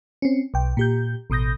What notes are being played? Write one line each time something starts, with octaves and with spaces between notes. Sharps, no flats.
C4 C#4
B1 G5
A#2 G4 G6
A1 B2 D#6 G6 A#6